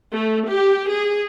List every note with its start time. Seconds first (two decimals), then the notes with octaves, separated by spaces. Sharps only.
0.14 A3
0.51 G4
0.90 G#4